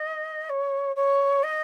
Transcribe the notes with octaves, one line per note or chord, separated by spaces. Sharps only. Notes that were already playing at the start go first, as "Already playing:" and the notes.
Already playing: D#5
C#5
C#5
D#5